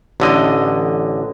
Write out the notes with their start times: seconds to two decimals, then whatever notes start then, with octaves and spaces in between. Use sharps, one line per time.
0.20 A1 D3 D#5